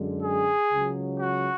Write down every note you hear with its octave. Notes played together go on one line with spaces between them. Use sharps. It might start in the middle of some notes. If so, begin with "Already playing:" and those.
Already playing: F#2 D3 G#3
G#4
C#2 C#3 F#3
F#4